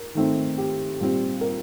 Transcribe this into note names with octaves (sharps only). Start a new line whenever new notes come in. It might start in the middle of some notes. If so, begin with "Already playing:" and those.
Already playing: A#4
D#3 A3 C4
G4
A#2 G3 C4
A#4